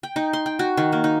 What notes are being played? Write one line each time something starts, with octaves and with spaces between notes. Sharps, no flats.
G5
D#4
C6
G5
F#4
D#3
A#3
D#4